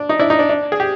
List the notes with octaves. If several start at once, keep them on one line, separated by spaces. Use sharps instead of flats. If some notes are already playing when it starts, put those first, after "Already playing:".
Already playing: D4
D#4
D4 E4
D#4
D4
D4
G#4
G4